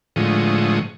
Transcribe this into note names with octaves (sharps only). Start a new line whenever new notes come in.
A2 D3 F3 G#3 C#6 D#6